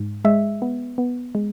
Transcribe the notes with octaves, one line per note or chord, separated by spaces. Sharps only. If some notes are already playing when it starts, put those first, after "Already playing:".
Already playing: G#2
G#3 E5
B3
B3
G#3